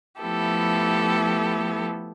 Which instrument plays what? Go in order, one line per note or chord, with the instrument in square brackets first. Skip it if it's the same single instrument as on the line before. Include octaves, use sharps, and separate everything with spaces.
[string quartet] F3 A3 B3 E4 G4 A4